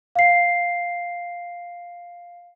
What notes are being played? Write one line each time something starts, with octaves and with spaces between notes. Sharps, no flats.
F5 C7